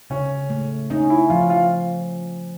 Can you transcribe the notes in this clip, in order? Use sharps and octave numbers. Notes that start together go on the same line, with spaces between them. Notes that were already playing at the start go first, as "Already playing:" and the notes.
C#3 C#4
A3
C#4 D#4
E4
F3 F4
F4